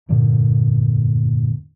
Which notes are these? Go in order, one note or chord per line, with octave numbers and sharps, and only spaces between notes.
F1 G2 A#2 D3